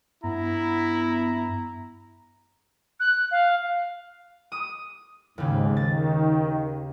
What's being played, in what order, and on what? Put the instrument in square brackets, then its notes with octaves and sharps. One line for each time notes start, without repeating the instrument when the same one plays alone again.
[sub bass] G2 [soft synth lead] B3 [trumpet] E4 [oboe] A#5
[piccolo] F#6
F5
[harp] D#6 D#7
[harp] D#2 C#3 [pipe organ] G#2
[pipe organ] D#3 [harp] A6